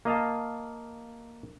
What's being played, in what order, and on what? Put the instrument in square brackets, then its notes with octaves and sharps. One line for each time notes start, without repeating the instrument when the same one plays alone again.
[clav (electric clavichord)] A#3 D#5 F5 A5